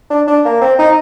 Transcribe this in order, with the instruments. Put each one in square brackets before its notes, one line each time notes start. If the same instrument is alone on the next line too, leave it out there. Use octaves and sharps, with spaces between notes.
[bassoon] D4
D4
A#3
C4
D#4